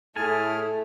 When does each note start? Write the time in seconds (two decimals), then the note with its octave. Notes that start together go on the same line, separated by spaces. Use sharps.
0.16 A2 A3 E4 G#4 A4 G#5 F6